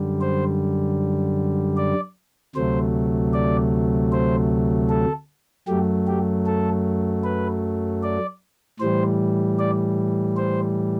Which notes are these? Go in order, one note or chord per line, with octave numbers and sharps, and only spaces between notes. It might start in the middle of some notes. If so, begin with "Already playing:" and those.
Already playing: F#2 D3 G3
C5
D5
D2 C3 F#3 A3 C5
D5
C5
A4
F#2 F#3 A3 G4
G4
A4
B4
D5
A2 E3 G3 C5
D5
C5